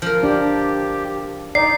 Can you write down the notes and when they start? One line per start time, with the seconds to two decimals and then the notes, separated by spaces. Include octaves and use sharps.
0.02 F3 A#4
0.23 D4 G4
1.55 D#4 D5 C7